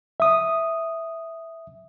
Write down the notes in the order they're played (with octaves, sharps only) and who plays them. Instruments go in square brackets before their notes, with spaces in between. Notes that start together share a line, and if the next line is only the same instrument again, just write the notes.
[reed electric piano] E5 D#6